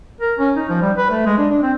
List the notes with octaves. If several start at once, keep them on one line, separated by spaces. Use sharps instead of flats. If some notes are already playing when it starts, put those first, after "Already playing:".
A#4
C#4
D#4
F3
G3
B4
A3
G#3
D4
D4
C4